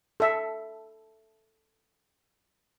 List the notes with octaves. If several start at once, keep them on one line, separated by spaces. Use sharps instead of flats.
A4 E5